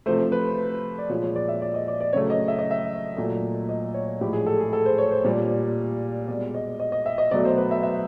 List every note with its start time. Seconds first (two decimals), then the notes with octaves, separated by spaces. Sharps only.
0.06 C3 F3 A3 C5
0.32 B4
0.98 D5
1.09 A#2 F3 G#3 C#5
1.23 C#5
1.36 D5
1.49 E5
1.62 D5
1.74 D#5
1.88 D5
2.01 D5
2.13 C#3 F#3 A3 C#5
2.30 D#5
2.48 E5
2.58 D#5
2.71 E5
3.17 A#2 F#3 A3
3.69 D#5
3.94 C#5
4.21 A2 F3 G#3 G4
4.33 G#4
4.46 A4
4.60 G#4
4.73 A4
4.86 C5
4.98 C#5
5.11 C5
5.24 A#2 G3
6.28 B2 D5
6.32 G#3
6.54 D#5
6.80 D#5
6.92 D#5
7.06 E5
7.18 D#5
7.31 B2 F#3 A3 D5
7.45 C5
7.57 B4
7.71 E5
7.83 E5